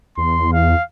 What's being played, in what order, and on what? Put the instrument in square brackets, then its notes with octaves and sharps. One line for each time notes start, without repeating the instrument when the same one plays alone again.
[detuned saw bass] E2 [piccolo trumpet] C6
[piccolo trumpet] F5